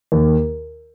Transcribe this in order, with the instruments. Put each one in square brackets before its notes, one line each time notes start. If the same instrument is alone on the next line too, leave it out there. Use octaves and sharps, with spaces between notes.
[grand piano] D#2